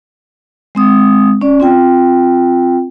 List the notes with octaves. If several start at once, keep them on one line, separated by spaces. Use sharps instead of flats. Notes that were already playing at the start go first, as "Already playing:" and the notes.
G#3 C4 D#6
C#4 D5
C4 F4 G5